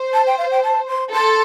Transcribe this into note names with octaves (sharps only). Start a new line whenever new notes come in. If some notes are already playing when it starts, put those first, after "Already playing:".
Already playing: C5
A5
G5
F5
G5
A5
C6
A4 C6